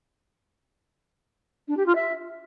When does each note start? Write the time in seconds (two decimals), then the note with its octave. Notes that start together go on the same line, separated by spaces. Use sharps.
1.68 D4
1.77 G4
1.86 F4
1.95 E5